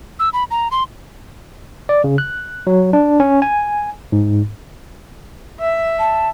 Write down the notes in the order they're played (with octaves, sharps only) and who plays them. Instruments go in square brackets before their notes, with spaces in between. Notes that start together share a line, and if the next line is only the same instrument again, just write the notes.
[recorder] E6
B5
A#5
C6
[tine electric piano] D5
C#3
F#6
F#3
D4
C#4
G#5
G#2
[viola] E5
[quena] A5